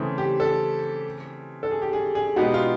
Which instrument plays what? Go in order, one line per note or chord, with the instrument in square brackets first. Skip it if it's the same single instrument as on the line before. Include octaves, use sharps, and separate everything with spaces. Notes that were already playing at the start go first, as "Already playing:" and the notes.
Already playing: [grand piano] C#3 E3 A3 C4
[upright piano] G4
A4
A4
G#4
G4
G#4
G#4
[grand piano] B2 G#3 B3 D#4 G4 [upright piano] F#4
[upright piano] F4